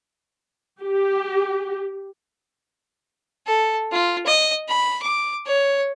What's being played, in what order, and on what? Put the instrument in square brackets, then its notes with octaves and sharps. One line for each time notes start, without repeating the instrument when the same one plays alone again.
[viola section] G4
[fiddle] A4
F4
D#5
B5
D6
C#5